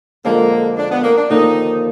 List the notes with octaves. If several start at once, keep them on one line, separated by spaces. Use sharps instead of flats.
F2 D3 F3 G#3 A#3
D4
B3
A#3
D4
D#2 D3 F3 A#3 D#4